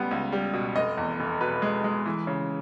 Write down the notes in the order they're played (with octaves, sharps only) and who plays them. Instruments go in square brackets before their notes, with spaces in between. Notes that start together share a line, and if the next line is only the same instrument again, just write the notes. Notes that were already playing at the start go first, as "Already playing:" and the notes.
Already playing: [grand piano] C#2 G3 B3
C#2
G3
B2
F1 D#5
E2
F1
B2 B4
G#3
G#3
E3
C#3